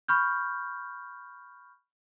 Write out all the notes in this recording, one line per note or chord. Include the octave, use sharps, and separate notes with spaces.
B5 C#6 F6 G6